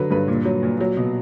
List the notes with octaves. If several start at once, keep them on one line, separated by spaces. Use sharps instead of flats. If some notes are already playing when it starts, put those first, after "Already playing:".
Already playing: D3 F#3 B4
G2 B4
A#2
F#3
A#2
F#3
B2